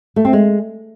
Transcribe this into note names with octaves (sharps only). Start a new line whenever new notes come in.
A3
C4
G#3